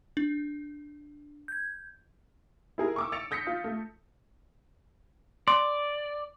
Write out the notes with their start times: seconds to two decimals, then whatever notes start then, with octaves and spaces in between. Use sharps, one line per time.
0.17 D4
1.48 G6 G#6
2.78 E4 G#4 A#4
2.96 C#6 D6 E6
3.12 E6 A6 C#7 D7 F7
3.31 D#6 G6 A#6 B6 C#7
3.47 F4
3.64 A3
5.48 D5 C6